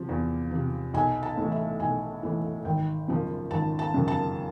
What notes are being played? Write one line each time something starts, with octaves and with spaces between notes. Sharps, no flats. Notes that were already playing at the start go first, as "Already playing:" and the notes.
Already playing: C3 F3
E2
C3 F3
B1 G#5
A5
A2 E3
E5
B1 G#5
A2 E3
G#1 G5
F#2 C#3 F3
G#1 A5
A5
F#2 C#3 F3
A5